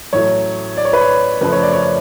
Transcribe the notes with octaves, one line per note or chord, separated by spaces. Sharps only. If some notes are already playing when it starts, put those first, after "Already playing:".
A1 A2 F#3 A3 C#5
D5
C#5
B4
C#5
F#1 F#2 F3 A3 B4
C#5
D5
C#5